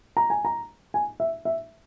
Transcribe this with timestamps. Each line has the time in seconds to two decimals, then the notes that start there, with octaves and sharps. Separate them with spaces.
0.17 A#5
0.30 G#5
0.45 A#5
0.94 G#5
1.20 E5
1.45 E5